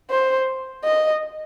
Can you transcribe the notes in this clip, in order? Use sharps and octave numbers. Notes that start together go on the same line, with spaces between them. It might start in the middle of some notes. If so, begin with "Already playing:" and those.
C5
D#5